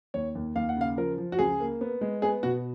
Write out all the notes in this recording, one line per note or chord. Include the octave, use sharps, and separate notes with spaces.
D#2 C#5
D#2
D#2 F5
F#5
C#3 F5
F3 A#4
F3
F#4
C#2 G#4
A#3
B3
G#3
B3 G#4
B2 F#4